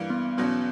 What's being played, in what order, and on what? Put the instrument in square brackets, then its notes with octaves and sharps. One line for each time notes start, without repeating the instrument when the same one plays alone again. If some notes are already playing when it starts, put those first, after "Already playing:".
Already playing: [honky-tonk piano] G2 E3 A#3
[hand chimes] B3
[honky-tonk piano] E2 B2 F#3 C#4 [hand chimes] B3